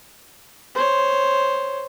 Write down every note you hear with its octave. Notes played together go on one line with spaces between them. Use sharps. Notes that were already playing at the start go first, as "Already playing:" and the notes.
C5 C#5